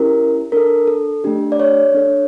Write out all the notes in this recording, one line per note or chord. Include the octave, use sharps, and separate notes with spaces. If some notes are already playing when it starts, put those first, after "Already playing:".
Already playing: C#4 E4 G4 A#4
D4 A4 A#4
A4
A3 D4 G4
D5
C#5
D4 A4